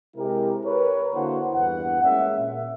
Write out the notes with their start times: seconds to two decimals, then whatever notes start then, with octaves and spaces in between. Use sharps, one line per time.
0.16 C3 G#3 E4 G4 A#4
0.65 A#4 B4 C#5
1.14 D3 A#3 E4 F#4 C5 F#5
1.54 E2 G2 B4 F#5
2.03 G#3 A#3 C#4 E5
2.38 A#2